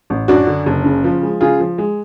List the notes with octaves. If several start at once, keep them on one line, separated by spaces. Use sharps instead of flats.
A1
F#2 D4 F#4
D3
F#1
C#3
F3
G#3
C#3 F4 G#4
F3
G#3